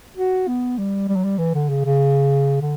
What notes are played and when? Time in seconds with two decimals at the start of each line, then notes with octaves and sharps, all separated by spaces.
0.17 F#4
0.48 B3
0.78 G3
1.08 G3
1.16 F#3
1.24 G3
1.38 E3
1.54 D3
1.69 C#3
1.85 C#3
2.61 D3